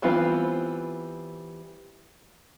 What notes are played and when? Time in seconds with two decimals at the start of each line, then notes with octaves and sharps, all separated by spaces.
0.02 E3 G3 B3 C4 F4